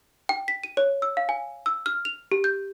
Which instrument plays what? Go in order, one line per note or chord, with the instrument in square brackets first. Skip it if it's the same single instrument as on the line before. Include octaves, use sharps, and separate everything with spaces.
[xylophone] G5
B6
D#7
C#5
E6
F5
G#5
E6
F6
F7
G4
G6